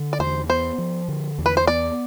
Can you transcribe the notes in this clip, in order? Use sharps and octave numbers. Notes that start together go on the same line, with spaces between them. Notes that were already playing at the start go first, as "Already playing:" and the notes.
Already playing: D3
D5
E2 C5
B3 C5
F3
D3
E2
B4
C5
B3 D5